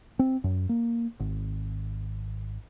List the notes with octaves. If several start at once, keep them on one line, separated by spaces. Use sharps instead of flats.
C4
F#2
A#3
G#1